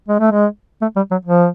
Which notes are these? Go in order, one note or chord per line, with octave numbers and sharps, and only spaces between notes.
G#3
A3
G#3
A3
G3
F#3
F3